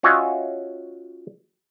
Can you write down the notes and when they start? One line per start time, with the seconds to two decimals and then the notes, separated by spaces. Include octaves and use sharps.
0.03 C#4 F4 F#4 C#5 D#5 E5